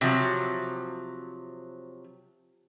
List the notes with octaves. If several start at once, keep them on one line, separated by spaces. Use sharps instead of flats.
C3 F3 F#3